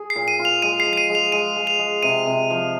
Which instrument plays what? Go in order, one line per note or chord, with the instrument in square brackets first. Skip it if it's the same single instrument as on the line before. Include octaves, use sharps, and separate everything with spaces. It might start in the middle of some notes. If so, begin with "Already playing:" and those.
Already playing: [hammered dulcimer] G#4
[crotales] C7
[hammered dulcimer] A#2
[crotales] D#7
[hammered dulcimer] F4
[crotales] F7
[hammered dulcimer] G#3 [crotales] D#7
[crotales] C7
[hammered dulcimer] F3
[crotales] C7
D#7
[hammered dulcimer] G#3
[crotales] F7
[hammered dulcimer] G#3 [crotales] D#7
[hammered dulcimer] G#3
[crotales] F7
[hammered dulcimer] G#3
[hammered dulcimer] C3 [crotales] D#7
[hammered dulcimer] C3
F3